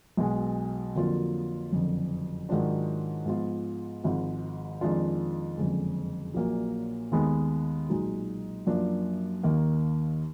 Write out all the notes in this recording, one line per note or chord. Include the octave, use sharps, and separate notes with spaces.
B1 B2 G#3
F2 D3 F#3 A#3 F4
F#1 F2 D3
G#2 D#3 F#3 D4 F4
G#2 F3 B3 F4
G#1 G#2 F3
F2 D#3 G#3 D4 F4
F#1 F2 D3 G#3
A#1 A#2 F#3 A#3
D#2 D#3 G#3 B3 D#4
B1 A#2 G#3 D#4 F#4
F#2 F3 A#3 D4
D#2 D#3 A#3